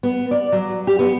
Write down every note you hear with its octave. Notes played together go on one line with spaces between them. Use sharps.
B3
D5
F#3
G4
B3